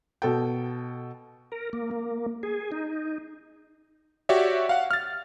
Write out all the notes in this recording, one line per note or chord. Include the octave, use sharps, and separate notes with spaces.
B2 A4 G5
A#4
A#3
A#3
G#4
D#4
F#4 G4 C#5 D5 E5
F5 F#5
F6 A6